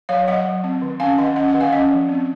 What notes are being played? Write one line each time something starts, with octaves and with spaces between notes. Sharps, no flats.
F#3 C#5 F5
F#3 D#5 F#5
F#3
C4
D#3
C#4 F5 G#5
D#3 D#5 F#5
C#4 D#5 F#5
D#5 F#5
D#3
F5 G#5
C#4 D#5 F#5
F3
C4